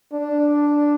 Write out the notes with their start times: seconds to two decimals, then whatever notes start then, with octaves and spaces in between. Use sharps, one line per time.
0.13 D4